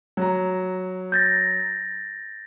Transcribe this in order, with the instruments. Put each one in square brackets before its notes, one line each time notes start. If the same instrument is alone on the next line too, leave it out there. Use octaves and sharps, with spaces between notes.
[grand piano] F#3 A#5
[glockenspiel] G6 A6 A#6